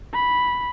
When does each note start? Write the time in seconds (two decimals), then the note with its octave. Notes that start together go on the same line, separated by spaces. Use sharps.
0.14 B5